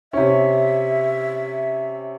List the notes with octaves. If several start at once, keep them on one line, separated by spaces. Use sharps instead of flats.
C3 C#4 E5